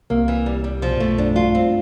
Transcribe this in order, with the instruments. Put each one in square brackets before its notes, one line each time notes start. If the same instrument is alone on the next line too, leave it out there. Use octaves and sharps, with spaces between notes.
[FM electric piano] C2 C3 [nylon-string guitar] A#3
[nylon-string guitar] E3
G3
G3
[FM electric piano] B1 B2 [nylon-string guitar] F3
[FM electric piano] G2
[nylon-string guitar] A3
[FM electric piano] F#2
[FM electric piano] F#2 [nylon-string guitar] D4
[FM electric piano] G2
[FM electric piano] F#2 [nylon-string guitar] F4
[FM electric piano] G2 [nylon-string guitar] C4